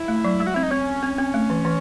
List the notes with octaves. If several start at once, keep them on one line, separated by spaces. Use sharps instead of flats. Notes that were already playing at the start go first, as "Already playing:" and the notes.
Already playing: E4
A3
F#3
G#3
F#4
C4 E4
D#4
C4 C#4
C4
C4
A3
E3
E3